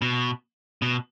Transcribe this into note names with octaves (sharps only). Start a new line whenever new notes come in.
B2
B2